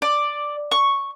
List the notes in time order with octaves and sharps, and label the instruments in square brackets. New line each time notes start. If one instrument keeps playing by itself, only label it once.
[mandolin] D5
C#6